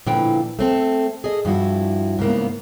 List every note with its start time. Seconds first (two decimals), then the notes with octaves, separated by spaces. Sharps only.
0.06 A#2 D3 F3 E4 B4 G5
0.59 A3 C4 A4
1.24 G#4 A4 D#5
1.45 G2 F3 E4 F#4
2.19 G#2 C#3 A#3 B3